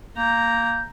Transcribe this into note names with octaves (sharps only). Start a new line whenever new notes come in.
A#3 A#5 G6